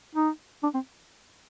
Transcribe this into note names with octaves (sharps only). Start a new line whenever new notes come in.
D#4
D4
C4